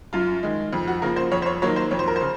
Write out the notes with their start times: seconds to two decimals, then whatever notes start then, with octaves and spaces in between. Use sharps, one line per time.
0.13 F#2 F4
0.43 D#3 G#3
0.73 F2
0.87 F#4
1.02 C#3 F3 A#3 A#4
1.16 C5
1.32 F2 C#5
1.42 C5
1.46 C#5
1.62 D#3 F#3 A#3 C#5
1.76 C5
1.91 F2 C#5
1.99 C5
2.07 A#4
2.16 C5
2.21 C#3